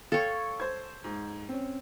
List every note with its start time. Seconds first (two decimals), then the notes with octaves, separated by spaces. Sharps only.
0.12 A4 C#5 F5 G5
0.60 C5 G#6
1.04 G#2
1.49 C4 C#4